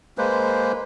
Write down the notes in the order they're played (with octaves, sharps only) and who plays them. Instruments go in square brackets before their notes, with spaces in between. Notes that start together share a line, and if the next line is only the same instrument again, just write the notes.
[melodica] G#3 A#3 B4 C5